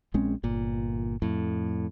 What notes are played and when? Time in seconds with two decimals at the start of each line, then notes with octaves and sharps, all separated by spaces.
0.14 A#1 G#3 C4 C#4
0.43 G1 A#2
1.22 F2 A2